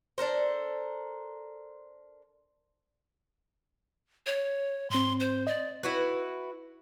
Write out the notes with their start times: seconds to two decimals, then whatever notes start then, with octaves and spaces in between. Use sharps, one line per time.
0.18 D4 A4 A#4 C5
4.26 C#5
4.90 G#2 C4 C6
5.20 C5
5.47 D5 D#5
5.83 E4 F#4 B4